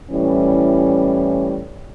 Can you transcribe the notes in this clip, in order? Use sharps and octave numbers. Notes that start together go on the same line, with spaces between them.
A2 E3 G3 C#4